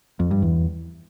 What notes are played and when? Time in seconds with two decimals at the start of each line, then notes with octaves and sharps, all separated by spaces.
0.20 F2
0.31 G2
0.42 E2